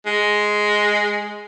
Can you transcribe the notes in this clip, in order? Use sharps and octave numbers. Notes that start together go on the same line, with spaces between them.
G#3